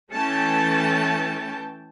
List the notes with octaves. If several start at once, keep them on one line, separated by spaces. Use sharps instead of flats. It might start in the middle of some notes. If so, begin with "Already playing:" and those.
E3 A3 C#4 G5 A5